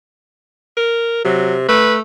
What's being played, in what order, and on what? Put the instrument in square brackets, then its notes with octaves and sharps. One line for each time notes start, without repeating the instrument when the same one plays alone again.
[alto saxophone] A#4
[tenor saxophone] C3 [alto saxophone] F#3
[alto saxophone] A3 [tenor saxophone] B4